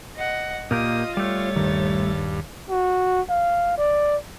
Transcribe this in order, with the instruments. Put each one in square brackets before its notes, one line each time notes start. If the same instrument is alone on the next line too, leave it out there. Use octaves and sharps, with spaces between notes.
[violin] D#5 F#5
[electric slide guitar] A#2 A#3 G4 [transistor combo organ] F4 [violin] D#5 D#6
[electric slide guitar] G3 A3 [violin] C#5 A6
[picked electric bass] D#1 D#3 [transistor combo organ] G2
[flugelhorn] F#4
F5
D5